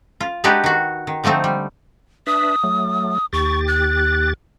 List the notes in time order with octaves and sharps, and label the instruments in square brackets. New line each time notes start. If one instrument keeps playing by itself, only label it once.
[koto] F4
G#3 D4 D#4 F#4 G4 B4
D#3 F#4
D#3
D3 F3 A3 C4 D#4
G3
[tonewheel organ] D4 B4 E5 [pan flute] D#6
[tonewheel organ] F#3 A3
[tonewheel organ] D#2 G4 A6 [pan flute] C#6
[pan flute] F#6